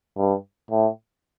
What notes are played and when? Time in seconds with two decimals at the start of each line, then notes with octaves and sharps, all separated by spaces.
0.17 G2
0.70 A2